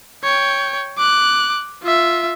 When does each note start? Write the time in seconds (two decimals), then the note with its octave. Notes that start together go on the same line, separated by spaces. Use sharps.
0.24 C#5 G5
0.97 D6 F#6
1.83 F4 E5